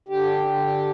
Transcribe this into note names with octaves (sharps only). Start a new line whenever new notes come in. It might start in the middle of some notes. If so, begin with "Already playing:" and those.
D3 G4
D3